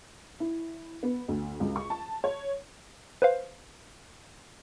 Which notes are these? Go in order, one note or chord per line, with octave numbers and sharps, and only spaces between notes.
E4
B3
D2
C#2
C#6
A5
C#5
B4 C5 F5